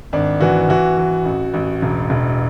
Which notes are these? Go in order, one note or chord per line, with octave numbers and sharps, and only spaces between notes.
G#1 D4
E3 F#4
E3 F#4
E3
A1
A1
E1
E1